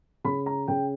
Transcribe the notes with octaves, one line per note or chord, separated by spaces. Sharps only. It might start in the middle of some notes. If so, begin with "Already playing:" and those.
C#3 B5
A#5
C#3 G5